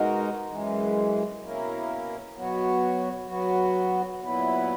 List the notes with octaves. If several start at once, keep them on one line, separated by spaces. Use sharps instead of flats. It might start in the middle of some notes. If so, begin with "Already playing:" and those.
Already playing: B2 G#3 D#4 F#4 A#4
F#2 E3 G#3
B2 A#3 C#4 E4 A#4
B2 F#3 B3 F#4 C#5
F#3 B3 F#4
A#2 F#3 B3 E4 B4